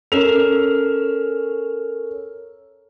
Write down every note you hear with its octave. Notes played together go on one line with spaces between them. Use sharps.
C#4 A4 A#4 F7